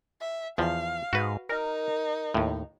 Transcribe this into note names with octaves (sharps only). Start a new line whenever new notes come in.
E5
E2 F3 F5
G#2 F#4 B4
D#4 A#4
D#2 A2